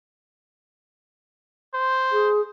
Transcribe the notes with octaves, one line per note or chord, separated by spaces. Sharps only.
C5
G#4